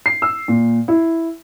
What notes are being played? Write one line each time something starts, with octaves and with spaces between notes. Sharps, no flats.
C7
E6
A#2
E4